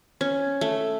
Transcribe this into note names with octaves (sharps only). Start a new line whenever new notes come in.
C#4
A3